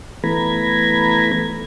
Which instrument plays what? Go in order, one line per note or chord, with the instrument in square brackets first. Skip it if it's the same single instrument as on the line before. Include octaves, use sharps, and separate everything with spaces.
[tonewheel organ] E3 A3 B3 A#5 B5 G#6